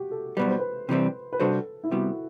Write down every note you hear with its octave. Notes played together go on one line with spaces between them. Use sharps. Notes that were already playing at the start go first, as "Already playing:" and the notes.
Already playing: F#4 G4
A4
B1 B2 G3 B4
C5
B4
C3 E3 G3 C4
B4
C3 G3 D4 F#4 A4 C5
E4
C3 G3 B3 F#4